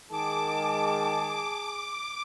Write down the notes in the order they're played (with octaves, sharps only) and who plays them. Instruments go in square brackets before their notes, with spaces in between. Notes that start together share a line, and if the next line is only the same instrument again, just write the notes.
[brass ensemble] D#3 G#3 [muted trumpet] G#4 [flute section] A5 [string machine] D6